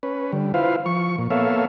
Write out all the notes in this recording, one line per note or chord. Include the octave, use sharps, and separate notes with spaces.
C#4 B4
D3 G3
E4 F4 B4 C5 F5
F3 C#6
A#2
A#3 B3 A4 C#5 E5 F5